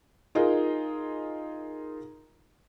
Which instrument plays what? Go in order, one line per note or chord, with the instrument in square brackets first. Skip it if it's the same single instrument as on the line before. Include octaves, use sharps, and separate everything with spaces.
[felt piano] D#4 F4 G#4 A#4 D#5